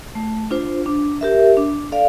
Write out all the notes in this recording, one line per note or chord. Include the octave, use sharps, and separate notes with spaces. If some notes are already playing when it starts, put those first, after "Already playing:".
A3
D4 F4 C5
D4
G4 A#4 E5
D4
A4 D5 F5